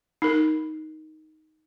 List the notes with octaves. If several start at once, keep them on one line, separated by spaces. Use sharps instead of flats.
D#4 A#4